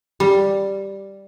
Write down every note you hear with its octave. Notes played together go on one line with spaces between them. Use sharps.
G3